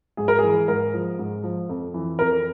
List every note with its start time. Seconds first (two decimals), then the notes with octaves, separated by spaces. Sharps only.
0.17 G#2 G#4
0.28 A#4
0.39 E3 G#4
0.68 G#2 A#4
0.94 F3
1.19 G#2
1.44 F3
1.69 F2
1.94 E3
2.19 F2 A#4